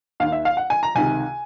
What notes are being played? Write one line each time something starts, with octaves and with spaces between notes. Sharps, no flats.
D#2 D#3 F5
E5
F5
F#5
G#5
A#5
C#2 C3 D#3 G#5